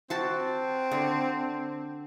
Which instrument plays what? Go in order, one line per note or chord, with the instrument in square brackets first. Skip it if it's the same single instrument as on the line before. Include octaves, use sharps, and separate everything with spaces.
[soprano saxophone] C4 [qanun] F#4 A5
[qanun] D3